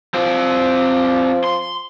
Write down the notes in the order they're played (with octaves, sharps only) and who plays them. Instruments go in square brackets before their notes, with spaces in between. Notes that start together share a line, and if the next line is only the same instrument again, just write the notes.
[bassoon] F3 [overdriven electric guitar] C4 D5
[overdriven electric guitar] C6